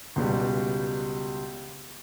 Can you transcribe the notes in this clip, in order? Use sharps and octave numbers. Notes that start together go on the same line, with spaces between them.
C#2 B2 G3